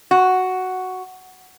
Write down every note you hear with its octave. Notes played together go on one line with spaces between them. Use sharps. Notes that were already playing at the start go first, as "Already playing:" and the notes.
F#4